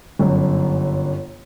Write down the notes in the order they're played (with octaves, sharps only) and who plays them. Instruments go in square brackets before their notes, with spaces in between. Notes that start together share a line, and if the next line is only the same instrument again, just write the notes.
[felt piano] G1 F#2